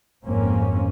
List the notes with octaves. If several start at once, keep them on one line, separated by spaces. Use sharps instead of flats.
G#1 F2 G#2 A#3 C4 C#4